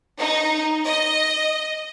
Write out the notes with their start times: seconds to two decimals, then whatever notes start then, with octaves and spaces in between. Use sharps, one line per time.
0.19 D#4
0.85 D#5